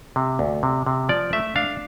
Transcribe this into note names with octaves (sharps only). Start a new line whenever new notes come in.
C3
D2
C3
C3
F3 D5
A3 E5
D4 F5